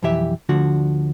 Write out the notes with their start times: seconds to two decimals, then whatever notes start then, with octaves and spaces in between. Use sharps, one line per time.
0.03 B1 F2 E3 G4 E5
0.49 D2 D3 F3 F#4